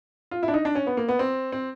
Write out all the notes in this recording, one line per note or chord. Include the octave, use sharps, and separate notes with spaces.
F4
E4
D4
D#4
D4
C#4
B3
A#3
B3
C4
C4